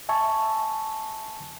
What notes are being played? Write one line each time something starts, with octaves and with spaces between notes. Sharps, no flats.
E5 G#5 A5 C#6